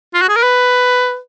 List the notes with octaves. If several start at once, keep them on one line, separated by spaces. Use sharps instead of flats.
F4
F#4
G#4
A#4
B4